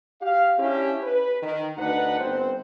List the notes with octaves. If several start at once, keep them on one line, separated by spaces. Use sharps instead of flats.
G4 F5
C#4 D4 E4 G4
B4
D#3
D2 D4 D#4 B4 F#5
G1 C4 C5